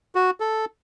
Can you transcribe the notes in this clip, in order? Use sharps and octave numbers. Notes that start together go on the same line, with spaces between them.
F#4
A4